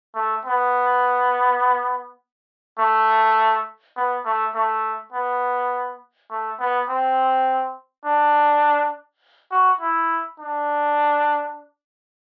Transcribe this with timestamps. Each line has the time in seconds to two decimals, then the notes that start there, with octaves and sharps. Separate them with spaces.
0.15 A3
0.45 B3
2.79 A3
3.96 B3
4.25 A3
4.54 A3
5.13 B3
6.30 A3
6.60 B3
6.89 C4
8.05 D4
9.51 F#4
9.81 E4
10.39 D4